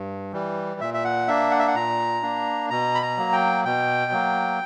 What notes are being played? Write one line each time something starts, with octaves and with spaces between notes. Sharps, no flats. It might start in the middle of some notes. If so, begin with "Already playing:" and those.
Already playing: G2
E3 G3
A#2 E5
E5
F#5
A#3 D4 E5
F#5
E5
F#5
A#2 A#5
A#3 D4
B2 A#5
B5
A#5
F#3 A#3
G5
B2 G5
F#3 A#3